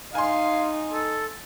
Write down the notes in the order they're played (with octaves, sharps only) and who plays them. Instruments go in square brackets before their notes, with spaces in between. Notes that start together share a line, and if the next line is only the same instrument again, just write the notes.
[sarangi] D#4 [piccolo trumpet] F5 [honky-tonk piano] G#5 C6
[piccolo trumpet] A4